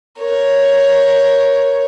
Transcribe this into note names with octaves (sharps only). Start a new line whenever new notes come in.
A#4 C#5